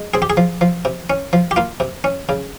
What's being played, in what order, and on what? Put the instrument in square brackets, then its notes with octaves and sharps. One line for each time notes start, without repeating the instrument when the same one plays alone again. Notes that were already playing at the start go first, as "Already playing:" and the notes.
Already playing: [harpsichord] G#3
C4 G#4
G4
G#4
F3
F3
C3
C#4
F3
G4
A#3 F4
C3
C#4
C#3